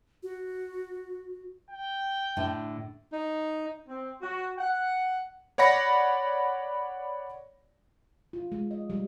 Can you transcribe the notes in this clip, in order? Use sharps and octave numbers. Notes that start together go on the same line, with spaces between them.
F#4
G5
A2 D3
D#4
C4
F#4
F#5
C#5 D5 F#5 B5 A#6 C#7
F4
G#3
D#5
G3